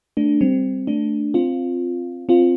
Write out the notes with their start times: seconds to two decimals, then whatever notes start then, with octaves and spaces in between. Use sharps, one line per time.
0.17 A3 D4
0.41 G3 C4
0.87 A3 D4
1.34 C4 F4
2.29 C4 F4